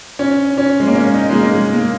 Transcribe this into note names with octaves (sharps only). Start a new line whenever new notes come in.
C#4
C#4
G#3
A#3
C#4
D#4
G#3
A#3
G#3
A#3